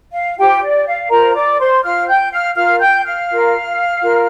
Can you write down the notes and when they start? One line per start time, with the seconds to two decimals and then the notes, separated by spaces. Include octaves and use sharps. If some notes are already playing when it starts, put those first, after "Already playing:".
0.13 F5
0.37 F4 G4 C5 G5
0.61 D5
0.86 F5
1.10 F4 A#4 C5 A#5
1.34 D5 D6
1.58 C5 C6
1.83 F4 C5 F5 F6
2.07 G5 G6
2.31 F5 F6
2.55 F4 A#4 F5 F6
2.80 G5 G6
3.04 F5 F6
3.29 F4 A#4
4.01 F4 A#4